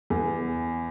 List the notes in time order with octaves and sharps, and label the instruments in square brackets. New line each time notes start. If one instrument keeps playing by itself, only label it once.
[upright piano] E2